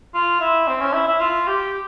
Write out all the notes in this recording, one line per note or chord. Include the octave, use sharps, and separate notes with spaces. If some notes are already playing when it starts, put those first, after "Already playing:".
F4
E4
C4
C#4
E4
E4
F4
G4